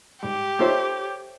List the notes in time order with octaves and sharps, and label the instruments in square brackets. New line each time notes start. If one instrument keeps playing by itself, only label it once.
[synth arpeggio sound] G#2 G3 [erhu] G4
[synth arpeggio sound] A#3 D#4 F4 [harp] A4 C5 E5 [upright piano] C#5